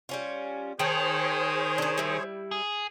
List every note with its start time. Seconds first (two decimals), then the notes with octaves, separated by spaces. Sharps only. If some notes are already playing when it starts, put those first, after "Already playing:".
0.09 G3 C#4 F4
0.79 D#3 G#4 C5 C#5 G5 A5
1.78 C#4 D4
1.98 G3 E4
2.51 G#4